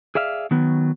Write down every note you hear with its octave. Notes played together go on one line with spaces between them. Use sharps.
G#4 D5 E5 F5
D#3 F#3 B3